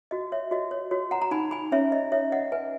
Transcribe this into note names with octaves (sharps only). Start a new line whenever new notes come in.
F#4 D#5
C#5 E5
F#4 D#5
C#5
F#4 C#5
F#5 A#5
A#5
D#4 G#5 B5
G#5 B5
C#4 C#5 E5
D#5
C#5 E5
D#5 F#5
B4 E5 G#5